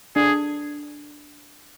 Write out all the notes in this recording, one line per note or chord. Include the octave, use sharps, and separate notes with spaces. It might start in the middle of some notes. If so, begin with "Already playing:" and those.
D4 G#4